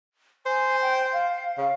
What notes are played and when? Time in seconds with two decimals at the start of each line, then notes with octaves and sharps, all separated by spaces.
0.46 C5 G#5
0.81 G5
1.13 F5
1.58 C#3 F5